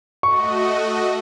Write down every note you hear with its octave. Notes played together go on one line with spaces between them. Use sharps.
A3 F#4 D#5 C#6